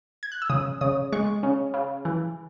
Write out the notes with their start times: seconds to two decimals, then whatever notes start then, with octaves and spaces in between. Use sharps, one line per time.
0.23 G#6
0.32 F#6
0.42 E6
0.50 C#3 D#6
0.81 C#3 D#6
1.12 G#3 C#6
1.43 C#3
1.74 C#3
2.05 E3